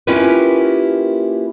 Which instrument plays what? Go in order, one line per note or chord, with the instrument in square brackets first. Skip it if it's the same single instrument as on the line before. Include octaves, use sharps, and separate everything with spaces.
[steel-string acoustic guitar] A#3 C#4 E4 F4 G4 B4